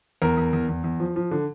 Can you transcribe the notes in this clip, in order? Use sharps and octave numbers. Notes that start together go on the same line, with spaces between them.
E2 A#4
E2
E2
E2
E2
F3
F3
D3